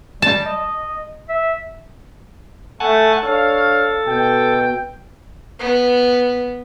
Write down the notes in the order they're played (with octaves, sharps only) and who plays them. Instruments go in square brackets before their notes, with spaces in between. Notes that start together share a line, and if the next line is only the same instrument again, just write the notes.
[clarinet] G3 [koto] A5
[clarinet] D#5
E5
[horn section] A3 [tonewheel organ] F#5 G#5 A5
[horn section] D4 C#5 F5 [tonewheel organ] A4
[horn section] B2 G5
[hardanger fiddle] B3